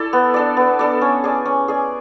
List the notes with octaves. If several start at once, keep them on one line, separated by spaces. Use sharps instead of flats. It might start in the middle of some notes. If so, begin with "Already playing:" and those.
Already playing: E4 A4 D5
B3
D4 A4 D5
B3
D4 A4 D5
C#4
G#4 D5
C#4
G#4 D5